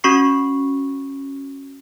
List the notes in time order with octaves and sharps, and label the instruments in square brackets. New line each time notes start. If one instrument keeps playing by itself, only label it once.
[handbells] C#4 F#4 C#6 C7